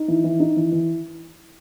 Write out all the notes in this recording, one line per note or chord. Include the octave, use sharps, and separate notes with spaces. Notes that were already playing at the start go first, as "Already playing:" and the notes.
Already playing: D#4
E3
E3
D#4
E3
E3